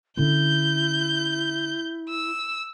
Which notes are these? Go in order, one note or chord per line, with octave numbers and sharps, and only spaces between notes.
D3 C#4 E4 G6
E6